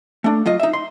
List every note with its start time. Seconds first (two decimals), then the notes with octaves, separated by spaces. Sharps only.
0.24 A3 D4
0.46 F#3 F4 D#5
0.60 D#4 E5
0.73 C6